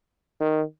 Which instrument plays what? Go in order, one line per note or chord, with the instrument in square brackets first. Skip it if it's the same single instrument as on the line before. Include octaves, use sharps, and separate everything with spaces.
[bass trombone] D#3